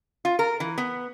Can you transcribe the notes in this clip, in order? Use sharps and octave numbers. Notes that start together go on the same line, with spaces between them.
F4
A#4
E3
B3